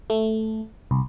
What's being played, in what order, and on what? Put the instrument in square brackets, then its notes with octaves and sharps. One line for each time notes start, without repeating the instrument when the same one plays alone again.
[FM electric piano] A3
C2